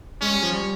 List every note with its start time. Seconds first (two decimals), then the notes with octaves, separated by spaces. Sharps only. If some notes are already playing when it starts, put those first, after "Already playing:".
0.21 G#3 C#4
0.33 G3
0.43 F3
0.53 G3